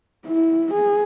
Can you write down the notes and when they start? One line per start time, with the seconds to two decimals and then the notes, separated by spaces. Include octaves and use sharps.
0.26 E4
0.73 G#4